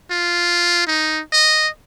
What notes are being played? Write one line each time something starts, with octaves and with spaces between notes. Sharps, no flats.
F4
D#4
D#5